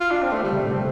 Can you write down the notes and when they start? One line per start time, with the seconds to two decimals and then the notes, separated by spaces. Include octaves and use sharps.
0.01 F4
0.11 D4
0.22 C4
0.32 A3
0.43 D3 G3
0.52 C3
0.58 A2 A3
0.71 C3 C4